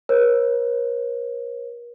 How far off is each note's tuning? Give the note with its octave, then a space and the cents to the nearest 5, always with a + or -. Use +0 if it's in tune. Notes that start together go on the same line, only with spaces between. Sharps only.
A#4 +40 C#5 -40